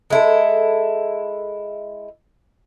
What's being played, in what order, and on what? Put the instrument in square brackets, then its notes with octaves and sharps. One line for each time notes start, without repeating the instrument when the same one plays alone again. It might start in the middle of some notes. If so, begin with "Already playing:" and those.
[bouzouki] G#3 E4 A4